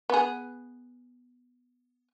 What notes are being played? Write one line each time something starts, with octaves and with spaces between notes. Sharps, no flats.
B3 G#4